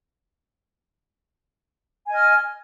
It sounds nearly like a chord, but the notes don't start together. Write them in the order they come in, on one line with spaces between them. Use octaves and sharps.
G#5 D#5 F6